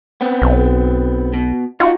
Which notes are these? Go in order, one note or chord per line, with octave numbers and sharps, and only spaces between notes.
B3 C4
B1
B2
D#4 F4 F#4